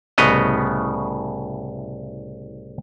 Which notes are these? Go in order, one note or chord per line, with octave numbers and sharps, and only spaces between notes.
C2 A2 C#3 B3 D#5 A#5